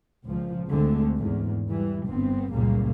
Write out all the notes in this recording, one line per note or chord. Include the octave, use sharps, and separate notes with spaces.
C#2 A#2 F3
D2 D3 G#3 A3 C4
E2 G#2
E3 G3
G1 G2 B3 C4
C#2 F#2 A#2 C#3 G3 A#3